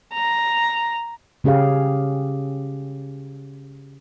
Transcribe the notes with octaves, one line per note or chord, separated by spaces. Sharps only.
A#5
C#3 C#4 G4 G#4 F5